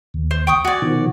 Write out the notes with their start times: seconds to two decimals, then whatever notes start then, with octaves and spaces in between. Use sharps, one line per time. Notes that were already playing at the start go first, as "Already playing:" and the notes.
0.14 D#2
0.31 C5
0.47 G5 C#6 D#6
0.65 F#4 D5 G#5
0.82 B2 D#3 F3